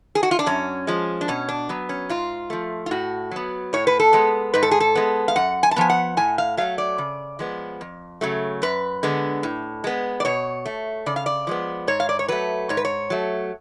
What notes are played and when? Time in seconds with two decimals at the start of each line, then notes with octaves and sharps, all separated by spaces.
0.15 G#4
0.23 F#4
0.31 F4
0.39 D4
0.46 F#2 C#4
0.87 F3 G#3
1.21 D4
1.28 B2 C#4
1.49 D4
1.69 F#3 B3
1.89 C#4
2.09 G#2 F4
2.50 F3 A3
2.86 F4
2.91 A2 F#4
3.31 F#3 B3
3.73 A2 C#5
3.87 B4
3.99 A4
4.13 G#3 B3
4.54 G#2 B4
4.63 A4
4.71 G#4
4.80 A4
4.95 G#3 B3
5.28 F5
5.36 F#2 F#5
5.63 G#5
5.71 A5
5.76 F3 B3 G#5
5.90 F#5
6.17 A2 G#5
6.38 F5
6.57 F#3 A3 F5
6.78 D5
6.98 C#3
7.39 F3 G#3 B3
7.81 F2
8.21 C#3 F#3 A3
8.62 F#2 B4
9.03 D3 G#3 B3
9.43 A2
9.84 G#3 B3
10.20 D5
10.25 B2 C#5
10.66 A3
11.06 C#3 D5
11.16 F5
11.26 D5
11.47 F3 G#3 B3
11.87 G#2 C#5
12.00 F5
12.09 D5
12.19 C#5
12.28 F#3 A3 B4
12.69 G#2 C#5
12.77 B4
12.85 C#5
13.10 F#3 A3